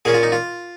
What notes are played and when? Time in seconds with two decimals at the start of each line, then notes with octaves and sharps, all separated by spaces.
0.05 A#2 A#3 C#4 G#4
0.14 F4
0.23 D#4
0.32 F4